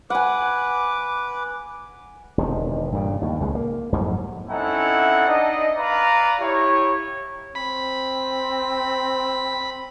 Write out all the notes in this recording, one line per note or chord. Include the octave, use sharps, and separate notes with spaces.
B4 F#5 G#5 D6
E1 C3 D#3
G2 A#2 C#3
D#2 A2
C#2 C#3 F3 G#3
A#3
F2 G#2 F#3 G3
C4 C#4 D#4 E4 A4 F#5
D4 D#4 D#5
B4 D5 F5 A#5
E4 G4 C#5
C4 B5